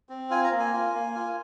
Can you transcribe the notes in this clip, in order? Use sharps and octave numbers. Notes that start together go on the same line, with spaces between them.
C4
F4 G#5
A#5
A#3
G#5
F4
A#3
F4